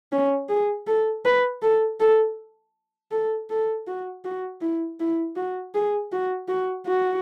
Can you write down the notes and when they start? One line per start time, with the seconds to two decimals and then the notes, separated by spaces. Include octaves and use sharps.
0.12 C#4
0.49 G#4
0.87 A4
1.25 B4
1.62 A4
2.00 A4
3.11 A4
3.50 A4
3.87 F#4
4.24 F#4
4.61 E4
5.00 E4
5.36 F#4
5.75 G#4
6.12 F#4
6.48 F#4
6.86 F#4